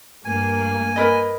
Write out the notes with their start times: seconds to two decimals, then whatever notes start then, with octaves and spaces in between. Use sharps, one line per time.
0.25 G2 A#3 G#5
0.96 A#4 B4 D#5